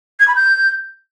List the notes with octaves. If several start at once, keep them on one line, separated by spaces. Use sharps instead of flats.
G#6
B5
G6